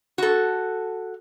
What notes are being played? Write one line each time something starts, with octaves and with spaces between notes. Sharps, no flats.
F#4 A4